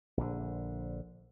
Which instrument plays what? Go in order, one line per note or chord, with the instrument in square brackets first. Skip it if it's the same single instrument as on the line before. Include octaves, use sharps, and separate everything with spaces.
[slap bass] A#1 D3